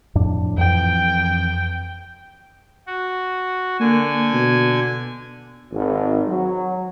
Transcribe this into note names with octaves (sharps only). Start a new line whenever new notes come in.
F2 A2 D4
F2 E3 G5
F#4
D3 A#3 G#5
B2
G#1
F#3